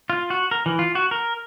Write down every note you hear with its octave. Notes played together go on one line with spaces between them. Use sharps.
F4
F#4
A#4
E3
F4
F#4
A#4